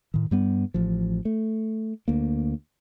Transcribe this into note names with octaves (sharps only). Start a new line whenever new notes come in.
A2 D#3
G2 G3 B3
A1 F3
A3
D2 A#3